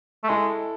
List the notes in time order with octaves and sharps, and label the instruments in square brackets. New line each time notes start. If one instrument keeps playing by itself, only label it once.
[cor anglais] A3
[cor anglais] G#3 [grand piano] E4 A4